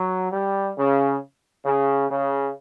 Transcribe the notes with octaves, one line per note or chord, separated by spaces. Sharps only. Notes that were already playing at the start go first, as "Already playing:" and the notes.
Already playing: F#3
G3
C#3
C#3
C#3